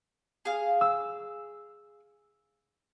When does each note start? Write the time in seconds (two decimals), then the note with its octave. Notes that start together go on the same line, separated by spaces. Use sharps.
0.45 G#4 F5
0.81 E6